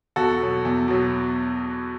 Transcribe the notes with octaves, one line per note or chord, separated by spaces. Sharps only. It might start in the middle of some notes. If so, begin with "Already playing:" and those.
E2 F#4 A4
B2 F#3
E2
B2 F#3